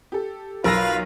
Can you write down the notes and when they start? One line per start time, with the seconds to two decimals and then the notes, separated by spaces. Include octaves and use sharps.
0.12 G4 A4
0.64 B1 F4 A#4 B4 F5 B5 E6 A#6